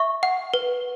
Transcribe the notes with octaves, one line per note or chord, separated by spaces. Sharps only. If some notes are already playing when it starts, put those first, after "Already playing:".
Already playing: E5 C#6
F#5
B4